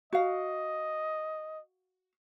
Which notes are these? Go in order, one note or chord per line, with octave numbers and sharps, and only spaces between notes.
F#4 D#5 F5